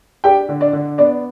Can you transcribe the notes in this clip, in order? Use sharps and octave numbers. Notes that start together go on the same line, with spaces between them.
D4 G4 G5
D3
D4 D5
D3
B3 D4 D5